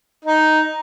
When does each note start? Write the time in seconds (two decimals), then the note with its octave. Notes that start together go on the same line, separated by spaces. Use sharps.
0.25 D#4